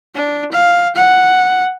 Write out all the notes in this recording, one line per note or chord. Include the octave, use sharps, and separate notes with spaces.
D4
F5
F#5